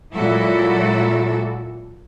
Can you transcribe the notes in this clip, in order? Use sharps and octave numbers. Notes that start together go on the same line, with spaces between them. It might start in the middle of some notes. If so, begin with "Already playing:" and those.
A#2 F#3 G#3 E4 F#4 A4